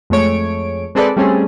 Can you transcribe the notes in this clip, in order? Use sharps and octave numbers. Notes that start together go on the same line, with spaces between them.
F2 G#3 A3 C#5 D7
G#3 C4 G#4 A4 B4 D5
G3 A3 C4 C#4 G#4 A4